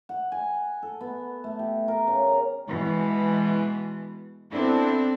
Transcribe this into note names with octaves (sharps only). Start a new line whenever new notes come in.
F#5
G#5
A4
B3
A3
G4
A#4
C#3
A#5
B2 E3 G#3
B3 C4 D4 E4 A4